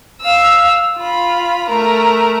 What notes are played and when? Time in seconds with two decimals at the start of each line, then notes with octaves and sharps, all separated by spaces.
0.21 F5 E6
0.98 F4 B5
1.68 A3 A#4